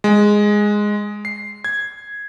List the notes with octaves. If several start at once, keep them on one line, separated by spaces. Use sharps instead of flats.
G#3
C7
G#6